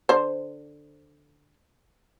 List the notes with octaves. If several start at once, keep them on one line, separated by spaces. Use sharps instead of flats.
D3 C5